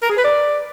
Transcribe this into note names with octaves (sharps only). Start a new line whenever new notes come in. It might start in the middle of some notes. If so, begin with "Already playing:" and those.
A#4
G#4
B4
D5